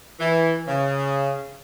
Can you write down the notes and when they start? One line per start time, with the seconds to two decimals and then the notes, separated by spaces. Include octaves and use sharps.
0.20 E3
0.68 C#3